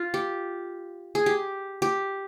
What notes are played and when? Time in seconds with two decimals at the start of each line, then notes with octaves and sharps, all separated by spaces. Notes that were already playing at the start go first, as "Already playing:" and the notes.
Already playing: F4
0.14 G4
1.15 G#4
1.26 G4
1.82 G4